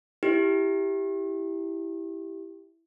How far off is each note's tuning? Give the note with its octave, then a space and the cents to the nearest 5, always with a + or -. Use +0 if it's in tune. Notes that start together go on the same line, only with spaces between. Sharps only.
E4 +0 G4 +0